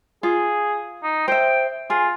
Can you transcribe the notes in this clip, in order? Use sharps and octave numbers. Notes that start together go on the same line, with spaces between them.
F4 G#4
D#4
C5 E5 G5
F4 G#4